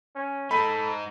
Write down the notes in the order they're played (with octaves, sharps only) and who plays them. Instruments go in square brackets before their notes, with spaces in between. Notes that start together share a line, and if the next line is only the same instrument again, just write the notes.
[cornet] C#4
[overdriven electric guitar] G#3 D#4 [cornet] A4 [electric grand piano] B5